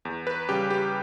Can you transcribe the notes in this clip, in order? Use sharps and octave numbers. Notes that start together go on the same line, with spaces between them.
E2
B4
C#3 G3 G4
G4